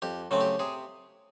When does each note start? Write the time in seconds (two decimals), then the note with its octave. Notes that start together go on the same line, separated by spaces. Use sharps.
0.02 F2 G4
0.31 C#3 F#3 A3 C4
0.41 G4
0.59 C3 G#4